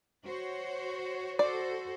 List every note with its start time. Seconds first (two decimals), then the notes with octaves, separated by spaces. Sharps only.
0.25 F#4 C5 C#5
1.39 F#4 A4 C5 D5